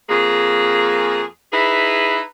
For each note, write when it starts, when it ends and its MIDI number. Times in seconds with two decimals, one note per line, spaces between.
0.09 1.22 41
0.09 1.22 58
0.09 1.22 68
1.52 2.20 63
1.52 2.20 64
1.52 2.20 68
1.52 2.20 71